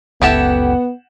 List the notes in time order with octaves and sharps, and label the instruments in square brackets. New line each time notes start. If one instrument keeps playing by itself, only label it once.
[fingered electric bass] F#1 C#2 [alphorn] B3 [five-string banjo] E4 G4 A4 [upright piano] F#5 E7